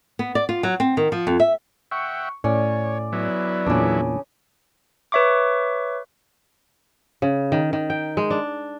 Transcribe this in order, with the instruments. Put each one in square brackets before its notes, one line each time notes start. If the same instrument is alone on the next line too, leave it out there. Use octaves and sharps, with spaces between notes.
[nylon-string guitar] B3
D5
F4
F#3
C4
D#3
F3
F2
E5
[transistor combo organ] E5 F#5 G5 [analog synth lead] C#6
[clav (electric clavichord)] A2 [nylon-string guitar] C#4 [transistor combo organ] C#5 [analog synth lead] D5
[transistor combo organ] F#3 B3 E4
[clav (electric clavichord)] E2 A#2 [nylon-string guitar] C#3 D4
[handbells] B4 C#5 E5 C#6 D6
[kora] C#3
D#3
D#3
G5
G#3
D4